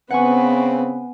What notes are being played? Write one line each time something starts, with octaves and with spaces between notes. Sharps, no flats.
C#3 B3 C4 B4 F#5 G#5 C#6
D7